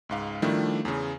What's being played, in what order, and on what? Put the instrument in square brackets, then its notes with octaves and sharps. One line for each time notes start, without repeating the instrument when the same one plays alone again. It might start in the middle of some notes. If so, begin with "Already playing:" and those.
[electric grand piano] C#2 G#2 F5
D#3 F3 G3 A3 D4 E4
E2 C#3